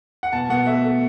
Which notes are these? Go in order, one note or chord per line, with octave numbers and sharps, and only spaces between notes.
F#5
B2 A5
B2 F#5
A3 E5
A3